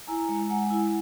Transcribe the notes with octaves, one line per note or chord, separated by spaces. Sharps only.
E4 G#5 A#5
G#3
G#3 F#5 G#5
E4